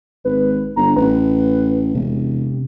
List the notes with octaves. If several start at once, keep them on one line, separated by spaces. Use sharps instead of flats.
G#1 B4
G1 A#5
A1 B4
E1 C3